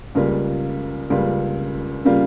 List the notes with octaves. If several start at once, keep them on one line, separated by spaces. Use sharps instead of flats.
C#2 C#3 G3 A#3 F4
C#2 C#3 G3 A#3 F4
C#3 G3 A#3 F4